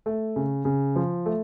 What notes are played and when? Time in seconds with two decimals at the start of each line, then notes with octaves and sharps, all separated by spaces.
0.06 A3
0.36 C#3
0.65 C#3
0.96 F3
1.26 A3